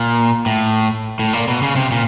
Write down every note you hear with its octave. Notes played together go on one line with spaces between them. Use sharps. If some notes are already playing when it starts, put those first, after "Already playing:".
Already playing: A#2
A2
A2
A#2
B2
C#3
C3
A#2